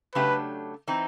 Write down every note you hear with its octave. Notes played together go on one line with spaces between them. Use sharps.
C#3 F#3 A3 D4 G4 B4
E3 C4 D#4